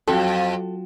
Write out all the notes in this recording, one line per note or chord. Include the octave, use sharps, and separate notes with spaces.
F2 F#3 F#4 A4 G5